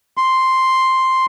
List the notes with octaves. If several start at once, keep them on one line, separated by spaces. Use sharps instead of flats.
C6